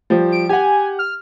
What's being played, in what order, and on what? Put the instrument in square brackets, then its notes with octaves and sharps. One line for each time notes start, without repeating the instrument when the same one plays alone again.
[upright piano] F3 G3 C5
[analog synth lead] D7
[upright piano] G4 F#5 [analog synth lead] G#5
[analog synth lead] F6